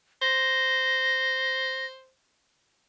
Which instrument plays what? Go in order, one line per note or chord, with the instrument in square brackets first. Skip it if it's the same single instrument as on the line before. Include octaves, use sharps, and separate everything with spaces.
[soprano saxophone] C5 [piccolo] A#6